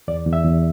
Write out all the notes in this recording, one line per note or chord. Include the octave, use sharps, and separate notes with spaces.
E2 D5
E2
E5
E2